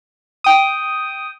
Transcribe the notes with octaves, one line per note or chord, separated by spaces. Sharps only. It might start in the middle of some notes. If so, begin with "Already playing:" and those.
G5 D#6